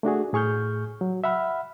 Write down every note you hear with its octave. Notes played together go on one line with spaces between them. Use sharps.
A3 D4 F#4 G#4
A2 G#4 C#6 F6 G6
F#3
E5 F#5 B5 F6